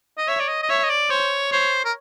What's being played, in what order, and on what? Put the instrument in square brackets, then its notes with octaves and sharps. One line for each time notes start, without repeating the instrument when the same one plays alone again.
[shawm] D#5
[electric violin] C#5 [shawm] E5
[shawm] D5
D#5
D#5
[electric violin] C#5 [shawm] E5
[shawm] D#5
D5
[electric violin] C5 [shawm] C#5
[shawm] C5 [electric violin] C#5
[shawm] A#4